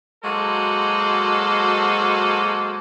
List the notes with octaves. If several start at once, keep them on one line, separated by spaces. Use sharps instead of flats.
F#3 G#3 A#3 F#4 A4 C5